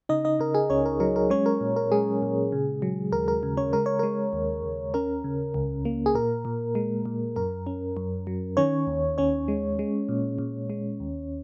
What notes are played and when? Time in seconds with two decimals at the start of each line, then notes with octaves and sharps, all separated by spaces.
0.09 C#3 D#4 D#5
0.25 D#4 D#5
0.40 C#3 A#4
0.55 G#4
0.70 C#2 C#4 C#5
0.86 A#4
1.00 F#3 A#4
1.16 A#4
1.30 G#3 C#4 C#5
1.46 A#4
1.61 A#2
1.76 A#4
1.92 G#3 G#4
2.22 A#2
2.52 C#3
2.82 F#3
3.12 D#2 A#4
3.28 A#4
3.43 C#3
3.57 C#4 C#5
3.73 G#3 A#4
3.86 C#5
3.99 G#3 A#4
4.33 D#2
4.64 D#2
4.94 C#4 A#4
5.24 C#3
5.54 C#2
5.85 A#3
6.06 G#4
6.15 A#2 A#4
6.45 A#2
6.75 G#3
7.06 A#2
7.36 F#2 A#4
7.67 C#4
7.97 F#2
8.27 F#3
8.57 D#3 C#4 C#5
8.87 D#2
9.18 D#2 C#4 C#5
9.48 G#3
9.79 G#3
10.09 A#2
10.38 A#2
10.70 G#3
11.00 D#2